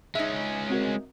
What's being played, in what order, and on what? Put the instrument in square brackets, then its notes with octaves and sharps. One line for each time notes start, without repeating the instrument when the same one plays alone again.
[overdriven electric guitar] G#3 C#4 [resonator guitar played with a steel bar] D#4 E5
[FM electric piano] C4 F#4 A#4